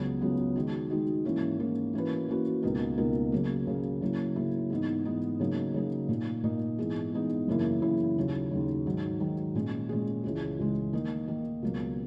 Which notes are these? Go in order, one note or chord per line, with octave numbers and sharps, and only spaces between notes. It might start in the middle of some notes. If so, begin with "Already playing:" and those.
Already playing: C#2 C#3 F#3 B3
C#2 C#3 F#3 B3
D#3 G#3 D#4 F#4
D#3 G#3 D#4 F#4
G#2 E3 A#3 C#4 E4
G#2 E3 A#3 C#4 E4
E3 A#3 C#4 F#4 B4
E3 A#3 C#4 F#4 B4
C#2 B2 A#3 D#4 A#4
C#2 B2 A#3 D#4 A#4
C#3 F#3 A#3
C#3 F#3 A#3
C#3 F#3 A#3 E4
C#3 F#3 A#3 E4
G#2 E3 B3 D#4
G#2 E3 B3 D#4
C#3 F#3 A#3 D#4
C#3 F#3 A#3 D#4
A#2 A#3 D#4
A#2 A#3 D#4
G#2 E3 B3 D#4 G#4
G#2 E3 B3 D#4 G#4
F#2 C#3 E3 A#3 E4
F#2 C#3 E3 A#3 E4
D#2 C#3 F#3
D#2 C#3 F#3
G#2 D#3 F#3
G#2 D#3 F#3
A#2 G#3 C#4 G#4
A#2 G#3 C#4 G#4
C#2 C#3 E3 G#3
C#2 C#3 E3 G#3
D#3 A#3 D#4
D#3 A#3 D#4
C#2 B2 F#3 A#3